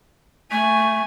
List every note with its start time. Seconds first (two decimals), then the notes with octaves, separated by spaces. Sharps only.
0.51 A3 G#5